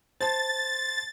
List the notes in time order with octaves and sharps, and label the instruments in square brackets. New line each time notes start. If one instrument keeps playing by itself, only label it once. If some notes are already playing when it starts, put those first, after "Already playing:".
[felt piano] C5 A5 [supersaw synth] A6